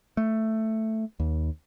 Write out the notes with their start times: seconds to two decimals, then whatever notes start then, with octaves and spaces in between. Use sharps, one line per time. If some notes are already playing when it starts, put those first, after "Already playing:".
0.17 A3
1.20 D#2